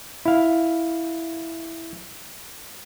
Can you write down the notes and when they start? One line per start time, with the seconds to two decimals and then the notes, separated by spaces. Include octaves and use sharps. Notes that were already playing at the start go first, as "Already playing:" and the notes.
0.26 E4 F5